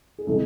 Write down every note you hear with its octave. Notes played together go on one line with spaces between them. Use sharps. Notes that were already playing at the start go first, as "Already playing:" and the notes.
G#4
C3 E3 G#3 A4